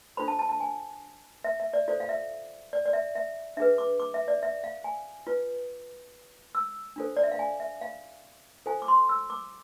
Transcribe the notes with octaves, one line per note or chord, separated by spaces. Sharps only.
D4 F4 A4 C5 B5
A5
A5
A5
G#5
E5
E5
D5
F4 A4 C5 D5
F5
E5
D5
D5
E5
E5
D4 G#4 B4 E5
D6
D6
E5
D5
E5
F5
G#5
F4 B4
E6
D4 F4 A4 C5
D5
E5
F5
G#5
E5
F5
F4 A4 C5 G#5
D6
C6
E6
D6